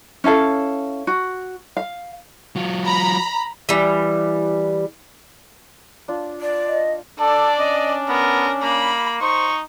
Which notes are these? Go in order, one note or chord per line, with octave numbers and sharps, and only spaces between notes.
C#4 E4 A4 F5
F#4
F5
F#3 F4
A#5 B5
E3 G3
D4 F4
D5
D#5
D4 A4 D5 A5
C#4 D#5
B3 A#4
A#3 B5
D#4 C5 C#6